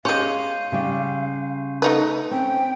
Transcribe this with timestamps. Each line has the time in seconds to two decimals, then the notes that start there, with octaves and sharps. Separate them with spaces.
0.05 G#3 C#4 G4 F5 C6 G6 D#7
0.72 C#3 G3 G4
1.82 A3 D#4 B4
2.31 C4 C#4 G5